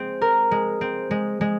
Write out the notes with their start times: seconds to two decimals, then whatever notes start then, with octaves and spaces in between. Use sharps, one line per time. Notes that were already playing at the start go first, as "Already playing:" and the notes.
Already playing: G#3 C4
0.21 A#4
0.51 G#3
0.81 C4
1.11 G#3
1.41 G#3